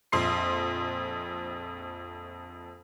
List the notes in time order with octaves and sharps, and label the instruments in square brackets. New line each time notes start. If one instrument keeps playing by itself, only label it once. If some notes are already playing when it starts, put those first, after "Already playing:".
[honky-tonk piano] A#1 F2 C6 C7